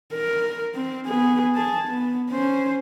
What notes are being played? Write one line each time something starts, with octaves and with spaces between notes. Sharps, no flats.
A#4
C4
B3 G#4
G#4 A5
B3
C#4 C5